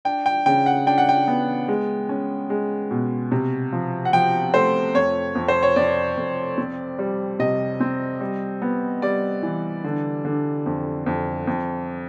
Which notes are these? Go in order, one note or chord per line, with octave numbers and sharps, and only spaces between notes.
D4 G5
G5
C#3 G5
F#5
D4 G5
F#5
G5
B3
G#3
C#4
G#3
B2
C3
F3
F#5
F3 G5
A3 C5
F2 C#5
F2
C5
C#5
F2 D5
F2
C4
G3
C3 D#5
C4
G3
B3
G3 D5
E3
D3
D3
F2
F2
F2